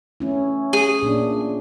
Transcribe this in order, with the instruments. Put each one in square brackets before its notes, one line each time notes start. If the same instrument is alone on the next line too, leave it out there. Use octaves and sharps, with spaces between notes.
[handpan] A3 C#4 E4
[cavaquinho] G#4
[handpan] A#2 A#3 D4